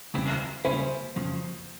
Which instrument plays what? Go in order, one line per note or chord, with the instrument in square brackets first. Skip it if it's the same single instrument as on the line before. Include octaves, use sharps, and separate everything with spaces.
[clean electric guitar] C#2 C#3 E3 G3 C4
[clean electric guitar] C#2 C#3 G3 C#4 E4 [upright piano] C5
[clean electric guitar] F2 C#3 F3